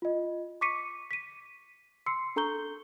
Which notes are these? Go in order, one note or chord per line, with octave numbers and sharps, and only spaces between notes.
F4 D#5
C#6 D6 B6 C#7 D#7
B6 D#7
C6 E6 C7 C#7
D4 A4 A#5 C#6 G6 G7